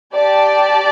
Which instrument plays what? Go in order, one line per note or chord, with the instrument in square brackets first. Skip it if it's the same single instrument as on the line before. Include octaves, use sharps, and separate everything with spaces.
[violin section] G4 D5 A5